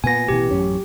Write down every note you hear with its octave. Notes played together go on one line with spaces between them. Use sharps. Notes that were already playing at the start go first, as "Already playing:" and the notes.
A#2 B3 G#5 A#6
A1 B2 E3 G4
A1 F#2 C#4